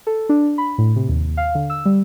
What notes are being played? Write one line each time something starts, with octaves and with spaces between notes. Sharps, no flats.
A4
D4
B5
A2
C3
D#2
D#2
F5
D3
E6
G3